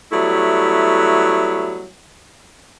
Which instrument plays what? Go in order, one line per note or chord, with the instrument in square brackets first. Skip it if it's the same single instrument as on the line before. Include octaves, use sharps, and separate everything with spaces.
[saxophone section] F#3 G3 A3 B3 E4